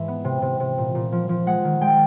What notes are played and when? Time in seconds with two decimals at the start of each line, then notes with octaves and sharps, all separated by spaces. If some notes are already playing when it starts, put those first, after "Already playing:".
Already playing: G#2 E3 G#3 E5
0.08 B3
0.25 C3
0.42 C3
0.60 C3
0.78 A#2
0.95 A#2
1.12 F3
1.29 F3
1.46 G#3 F#5
1.64 D#3
1.81 G#3 G5